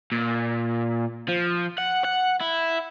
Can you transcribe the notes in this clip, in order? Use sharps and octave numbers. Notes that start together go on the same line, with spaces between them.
A#2
F3
F#5
F#5
E4